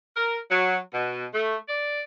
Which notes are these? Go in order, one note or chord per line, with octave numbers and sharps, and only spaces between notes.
A#4
F#3
B2
A3
D5